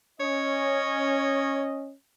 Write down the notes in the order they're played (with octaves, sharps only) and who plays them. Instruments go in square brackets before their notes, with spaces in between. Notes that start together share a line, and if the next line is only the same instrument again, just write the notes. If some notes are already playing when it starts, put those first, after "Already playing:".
[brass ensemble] C#4 D#5 [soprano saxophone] C#5